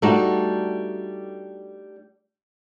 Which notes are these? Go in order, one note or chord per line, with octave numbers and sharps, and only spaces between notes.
G3 A3 D4 D#4 F#4